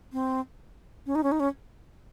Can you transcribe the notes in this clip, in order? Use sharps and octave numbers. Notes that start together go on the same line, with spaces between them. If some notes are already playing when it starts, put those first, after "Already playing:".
C4
C#4
D#4
C#4
D#4
C#4